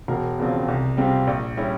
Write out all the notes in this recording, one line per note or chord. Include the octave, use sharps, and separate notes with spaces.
E1 A#4
E2 C#3 F3 C4
C2
C3 G3 C4 F4
A#1
G3 C#4 E4